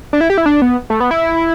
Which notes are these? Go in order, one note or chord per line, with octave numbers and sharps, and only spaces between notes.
D4
E4
G4
E4
D4
B3
A3
B3
E4